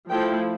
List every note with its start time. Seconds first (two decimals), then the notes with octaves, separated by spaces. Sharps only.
0.09 F3 A3 E4 G5